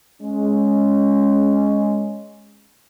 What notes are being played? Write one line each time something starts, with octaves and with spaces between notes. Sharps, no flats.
G#3 C#4